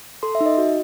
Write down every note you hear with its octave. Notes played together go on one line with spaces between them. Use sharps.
A4 C6
E5
D#4
D#5
F#4